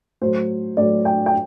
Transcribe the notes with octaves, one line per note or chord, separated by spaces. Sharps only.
A2 F#3 C5
A2 F#3 D5
G5
G5